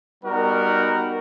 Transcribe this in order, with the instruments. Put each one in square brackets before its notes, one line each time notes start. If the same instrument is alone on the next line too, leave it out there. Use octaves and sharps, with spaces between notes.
[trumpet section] G3 B3 D#4 F#4 A#4